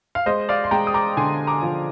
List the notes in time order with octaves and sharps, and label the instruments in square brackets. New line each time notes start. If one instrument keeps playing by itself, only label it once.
[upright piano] F5
[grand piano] G#3 [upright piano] C5 D#5
[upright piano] D5 F5
C6
[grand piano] G#3 [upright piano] G5 A#5
[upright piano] D#6
A#5 D6
[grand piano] D3 [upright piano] G#5 C6
[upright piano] A#5 D6
[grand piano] F3